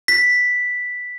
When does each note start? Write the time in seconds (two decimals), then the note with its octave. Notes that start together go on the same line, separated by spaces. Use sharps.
0.08 B6